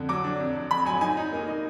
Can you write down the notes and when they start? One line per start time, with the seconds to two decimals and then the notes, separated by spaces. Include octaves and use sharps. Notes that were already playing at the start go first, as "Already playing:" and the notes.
Already playing: F2 D3
0.09 F#3 D6
0.24 D4
0.40 F2
0.56 F2
0.71 F2 B5
0.86 F#3 G#5
1.01 D#4 G#5
1.17 D#4
1.33 A#3
1.48 D#4